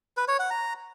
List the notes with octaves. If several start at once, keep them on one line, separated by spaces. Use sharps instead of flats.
B4
C#5
F#5
A#5